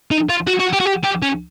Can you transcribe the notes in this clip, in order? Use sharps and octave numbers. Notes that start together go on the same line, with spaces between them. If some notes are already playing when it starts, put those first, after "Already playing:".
D#4
F4
F#4
F#4
G4
F#4
G4
G4
C#4